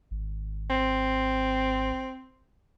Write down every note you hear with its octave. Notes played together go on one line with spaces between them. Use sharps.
G#1
C4